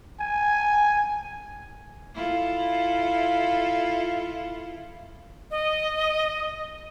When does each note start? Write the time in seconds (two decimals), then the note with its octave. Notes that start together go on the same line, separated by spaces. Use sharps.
0.20 G#5
2.15 E4 F4 A4
5.51 D#5